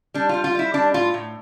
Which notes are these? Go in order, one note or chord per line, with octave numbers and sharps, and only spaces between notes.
G3 D4
G3 F4
F4
G3 E4
G3 D4
A2 F4
A2